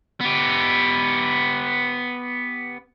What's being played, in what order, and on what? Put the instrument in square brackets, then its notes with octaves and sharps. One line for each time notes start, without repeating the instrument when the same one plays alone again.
[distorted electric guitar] B3 G4